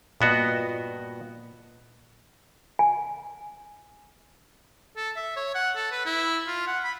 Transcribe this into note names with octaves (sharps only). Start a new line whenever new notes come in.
G2 A#2 B3 F#4 D#5
G#5
A4
E5
C#5
F#5
A4
B4
E4
F4
F#5
B5